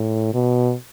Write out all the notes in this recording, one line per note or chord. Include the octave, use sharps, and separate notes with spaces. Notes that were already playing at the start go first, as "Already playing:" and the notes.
Already playing: A2
B2